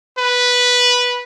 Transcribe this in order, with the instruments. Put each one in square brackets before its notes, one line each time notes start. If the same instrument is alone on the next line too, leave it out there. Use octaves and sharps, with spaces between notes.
[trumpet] B4